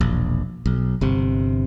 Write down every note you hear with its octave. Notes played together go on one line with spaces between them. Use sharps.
E1 A#1
B1
G1 C3